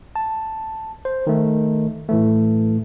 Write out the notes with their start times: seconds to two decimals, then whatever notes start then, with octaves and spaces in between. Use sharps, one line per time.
0.16 A5
1.05 C5
1.27 D#3 A3
2.09 A2 E3 A3